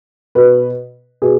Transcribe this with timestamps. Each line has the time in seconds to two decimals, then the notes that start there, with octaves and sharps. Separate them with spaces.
0.35 B2 B4
1.22 B2 G#4